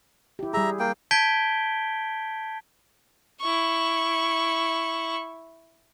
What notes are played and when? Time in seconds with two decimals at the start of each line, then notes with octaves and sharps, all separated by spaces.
0.39 E4 G4
0.54 G3 G#4 E5 A#5
0.80 A#3 G5
1.11 A5 G6 G#6 B6 D7 G7
3.41 E4 C#6